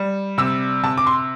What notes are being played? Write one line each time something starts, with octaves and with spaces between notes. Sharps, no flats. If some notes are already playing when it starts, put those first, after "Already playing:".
Already playing: G3
C3 E6
C3 A5
D6
C6